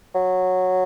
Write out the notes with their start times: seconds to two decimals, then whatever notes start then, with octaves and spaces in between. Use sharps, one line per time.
0.15 F#3